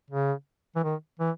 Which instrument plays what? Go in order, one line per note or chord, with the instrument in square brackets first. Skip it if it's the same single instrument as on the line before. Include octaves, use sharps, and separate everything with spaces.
[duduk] C#3
E3
D#3
E3